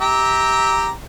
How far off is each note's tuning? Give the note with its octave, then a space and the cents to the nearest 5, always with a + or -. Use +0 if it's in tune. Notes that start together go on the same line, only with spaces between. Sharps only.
G4 +0 E5 -20 A#5 +0